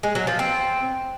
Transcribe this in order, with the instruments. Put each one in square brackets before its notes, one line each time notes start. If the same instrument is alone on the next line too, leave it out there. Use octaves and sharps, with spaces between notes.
[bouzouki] G#3
F#3
F3
C4